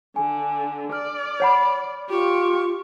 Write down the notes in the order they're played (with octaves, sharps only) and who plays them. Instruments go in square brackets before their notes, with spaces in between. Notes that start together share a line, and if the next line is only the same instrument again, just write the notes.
[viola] D3 [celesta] G#5
[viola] D5 [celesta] F6
[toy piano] C#5 F#5 B5
[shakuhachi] F4 [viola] G4 C#6